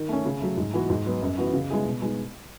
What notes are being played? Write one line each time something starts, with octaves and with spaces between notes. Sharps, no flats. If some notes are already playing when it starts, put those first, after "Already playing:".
Already playing: D#3
A3 C#4
C#3
F#3 A3
G#2
E3 B3 F#4
G#2
F#3 B3
F#2
E3 B3 F#4
C#3
G#3 B3 E4 G#4
B2
G#3 B3 D#4